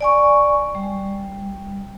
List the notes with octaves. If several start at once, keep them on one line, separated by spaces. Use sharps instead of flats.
D5 G#5 C#6
G3